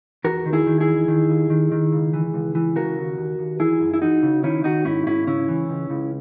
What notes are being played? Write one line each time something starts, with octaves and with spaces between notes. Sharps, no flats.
E2 F#4 A#4
D#3
E4 G#4
D#3
E4 G#4
E2
D#3
D#2
D#3
D#3
C#2
E3
C#2
E3
C#3 F#4 A#4
D#2
D#2
D#2
E3 E4 G#4
F#2
E4
E3 D#4 F#4
C#3
D#3 C#4 E4
D#3 D#4 F#4
G#2 C#4 E4
G#2 C#4 E4
C#3 C#4 E4
E3
C#2
C#2